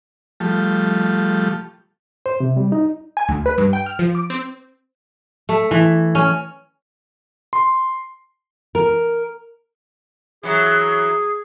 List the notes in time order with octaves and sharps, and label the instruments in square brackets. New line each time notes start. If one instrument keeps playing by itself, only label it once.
[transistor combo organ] F3 G3 A3
[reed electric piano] C5
C3
G3
D#4
[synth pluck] G#5
D2
B4
G2
G5
F6
F3
D6
C4
[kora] A3
E3
C#4
[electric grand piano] C6
[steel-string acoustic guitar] A#4
[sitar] E3 F#3 [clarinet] G#4